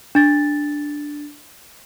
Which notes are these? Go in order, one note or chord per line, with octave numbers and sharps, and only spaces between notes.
D4 A6